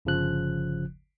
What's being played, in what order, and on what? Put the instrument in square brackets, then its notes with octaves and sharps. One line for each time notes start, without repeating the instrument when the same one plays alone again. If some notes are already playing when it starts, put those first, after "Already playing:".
[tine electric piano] G1 C#3 F3 F#6